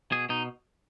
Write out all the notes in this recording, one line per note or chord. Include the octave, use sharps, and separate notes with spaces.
B2 G#4
B2 D#4